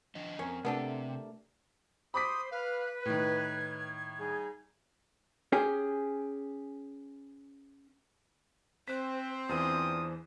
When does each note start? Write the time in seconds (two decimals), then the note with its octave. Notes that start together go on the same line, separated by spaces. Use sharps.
0.15 F3 D4 D#5
0.39 F2 C4 C#4 A#4
0.65 C3 A3 B3 D4 G4 A4
2.14 C5 B5 D6 D#6 B6
2.51 B4 F5
3.05 A2 D#3 G#6
4.18 G3 D#4 G#4
5.52 C#4 G4 G#4
8.88 C4 C5 F#6 B6
9.49 E2 E3 D4 F4 C5 D#6